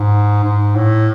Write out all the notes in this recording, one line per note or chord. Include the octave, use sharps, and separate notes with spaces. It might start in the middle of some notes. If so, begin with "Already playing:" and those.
Already playing: G#2
G#2
A2